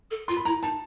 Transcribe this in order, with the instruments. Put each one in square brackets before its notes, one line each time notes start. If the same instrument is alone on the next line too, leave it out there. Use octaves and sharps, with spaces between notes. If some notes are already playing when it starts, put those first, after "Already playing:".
[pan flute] A4
[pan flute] F4 [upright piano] C6
[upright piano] B5
[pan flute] E4 [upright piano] A#5
[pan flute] D#4 [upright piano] A5